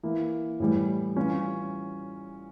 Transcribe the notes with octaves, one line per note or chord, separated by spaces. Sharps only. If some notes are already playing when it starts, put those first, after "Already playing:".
E3 A#3 E4
A2 E3 G3
E3 G3 C#4 F4